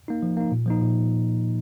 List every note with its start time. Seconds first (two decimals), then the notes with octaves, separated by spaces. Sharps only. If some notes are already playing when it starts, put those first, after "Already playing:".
0.08 A#3 D#4
0.23 F3
0.37 A#3 D#4
0.52 A#2
0.66 F3 A#3 D#4
0.81 A#2